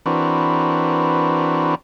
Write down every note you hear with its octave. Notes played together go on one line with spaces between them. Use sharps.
E3 C4 D4 F#4 A#4 B4